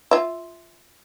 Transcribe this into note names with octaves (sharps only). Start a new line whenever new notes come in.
F4 E5